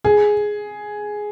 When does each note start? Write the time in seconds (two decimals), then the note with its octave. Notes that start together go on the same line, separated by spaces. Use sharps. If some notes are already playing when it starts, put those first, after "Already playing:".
0.04 G#4